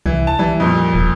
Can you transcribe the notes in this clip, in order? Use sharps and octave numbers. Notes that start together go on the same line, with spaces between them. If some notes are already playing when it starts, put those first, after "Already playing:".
C2 E3
A5
E3 G3
F2 A#2
D#1